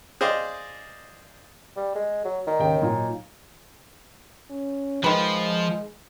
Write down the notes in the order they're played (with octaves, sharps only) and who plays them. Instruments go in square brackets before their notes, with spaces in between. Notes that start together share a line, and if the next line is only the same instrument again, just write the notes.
[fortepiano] G#4 C5 D5 D#5 F5
[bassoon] G3
G#3
F#3
[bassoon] D#3 [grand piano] D5 A#5
[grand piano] D#2 C#3 G5
A#2 F#3 D#4
[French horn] C#4
[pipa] D#3 B4 [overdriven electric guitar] F3 [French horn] G#3